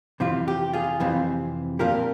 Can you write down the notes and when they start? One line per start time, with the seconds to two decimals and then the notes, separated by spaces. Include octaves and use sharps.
0.20 F2 C3 E3 F4
0.48 G4
0.73 F4 G#4
1.00 F2 C3 E3
1.79 A#2 F3 C4 F4 G4 A#4